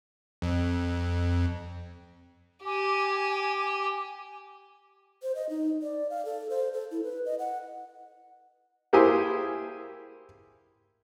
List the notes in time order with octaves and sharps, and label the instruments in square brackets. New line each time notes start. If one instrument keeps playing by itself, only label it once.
[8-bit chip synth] F2
[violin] G4 [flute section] G#5 D6
[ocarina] C5
D#5
D#4
D5
F5
A4
C5
A4
E4
B4
D#5
F#5
[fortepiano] A#3 E4 G4 G#4 C5 G#5